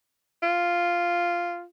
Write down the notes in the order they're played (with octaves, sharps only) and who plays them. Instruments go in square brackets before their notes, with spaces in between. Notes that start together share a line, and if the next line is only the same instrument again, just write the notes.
[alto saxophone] F4